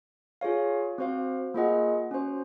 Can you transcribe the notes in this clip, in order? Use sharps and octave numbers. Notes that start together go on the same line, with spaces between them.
F4 G#4 C#5 F5
C4 F#4 C5 F5
A#3 F4 G#4 D#5 F#5
C#4 F#4 C5